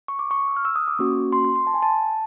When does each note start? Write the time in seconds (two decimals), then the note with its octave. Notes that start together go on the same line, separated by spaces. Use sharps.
0.08 C#6
0.19 D6
0.31 C#6
0.48 E6
0.56 F6
0.65 E6
0.76 D#6
0.88 D6
0.99 A#3 C#4 F#4 C#6
1.33 C6
1.45 C6
1.56 C6
1.67 A5
1.74 G#5
1.83 A5